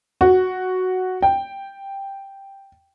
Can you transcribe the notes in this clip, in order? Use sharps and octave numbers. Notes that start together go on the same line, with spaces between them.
F#4
G5